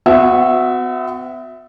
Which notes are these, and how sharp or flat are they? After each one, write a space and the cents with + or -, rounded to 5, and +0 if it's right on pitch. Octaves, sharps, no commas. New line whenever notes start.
B3 +45 F#4 -15 E5 +0